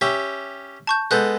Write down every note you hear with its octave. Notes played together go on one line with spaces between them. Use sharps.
C#4 G4 E5
A5 C#6 G6
G#3 B3 A4 F#6 G6